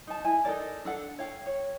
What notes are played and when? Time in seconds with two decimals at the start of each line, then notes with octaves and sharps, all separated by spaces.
0.07 D#4 A5
0.24 E4 G#5
0.45 D#4 A4 A#4 D5
0.85 D4 A4 F#5
1.19 C#5 F5 G5
1.46 C#5